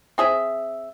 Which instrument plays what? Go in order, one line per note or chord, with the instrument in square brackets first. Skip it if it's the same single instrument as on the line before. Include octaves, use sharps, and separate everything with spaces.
[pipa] C4 G#4 E5